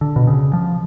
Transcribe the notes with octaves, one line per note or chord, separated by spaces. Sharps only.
D3
B2
C#3
F3